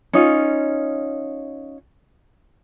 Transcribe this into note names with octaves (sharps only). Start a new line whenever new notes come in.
C#4 D#4 F4